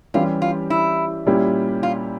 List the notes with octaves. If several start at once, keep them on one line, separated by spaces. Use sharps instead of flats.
E3 G3 C#4 F4 G4
F4
E4
A#2 G3 C#4 E4 G4
F4